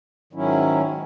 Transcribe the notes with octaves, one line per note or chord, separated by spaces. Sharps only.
G#2 D#3 F#3 C#4 E4